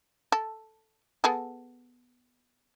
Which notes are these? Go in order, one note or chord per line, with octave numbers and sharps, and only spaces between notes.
A4
B3 G#4 A4